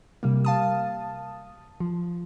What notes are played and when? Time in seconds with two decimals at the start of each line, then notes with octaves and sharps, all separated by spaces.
0.23 C3 G3 A#3
0.45 F5 A5 D#6
1.80 F3